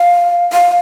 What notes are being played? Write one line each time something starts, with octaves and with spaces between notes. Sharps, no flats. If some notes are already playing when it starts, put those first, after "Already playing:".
Already playing: F5
F5